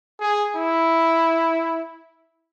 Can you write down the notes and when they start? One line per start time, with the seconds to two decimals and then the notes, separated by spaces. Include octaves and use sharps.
0.20 G#4
0.56 E4